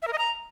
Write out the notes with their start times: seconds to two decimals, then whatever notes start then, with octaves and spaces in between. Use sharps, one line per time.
0.02 E5
0.08 A#4
0.13 D#5
0.18 A#5